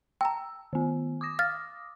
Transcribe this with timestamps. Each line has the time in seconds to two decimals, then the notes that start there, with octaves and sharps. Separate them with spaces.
0.21 G5 A5 A#5 E6
0.73 D#3 B3
1.21 D6 D#6 A#6
1.39 F5 F6 A6